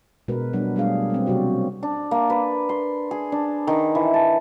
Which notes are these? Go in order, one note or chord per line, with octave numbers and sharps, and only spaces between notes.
B2 G#3 A#4 B4
F#3 G3 B3 D4
G3 A3 D4 G#4 F5
A#3 C4
C3 F#3 F#4 D5
D4
A#3
B4
C6
G#4
D4
D#3
E3
A5